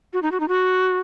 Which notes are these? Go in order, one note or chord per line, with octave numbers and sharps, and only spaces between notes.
F#4
D#4
F#4
D#4
F#4